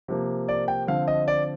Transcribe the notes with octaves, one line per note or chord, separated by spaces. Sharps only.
C3 F3 A#3
D5
G5
D3 F3 C4 F5
D#5
D5